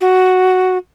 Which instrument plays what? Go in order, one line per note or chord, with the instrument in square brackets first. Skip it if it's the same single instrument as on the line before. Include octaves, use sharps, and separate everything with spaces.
[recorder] F#4